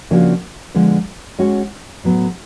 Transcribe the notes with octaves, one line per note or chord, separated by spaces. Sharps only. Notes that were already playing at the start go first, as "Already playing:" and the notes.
C#3 F3 A#3 D4 F#4
D3 F3 G#3 B3
G#3 C#4 F#4
A2 F#3 B3